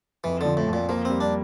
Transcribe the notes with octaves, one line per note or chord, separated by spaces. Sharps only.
F2 E3
D3 F3
A2
F2
A#2
F3 A#3
G3 C4
D4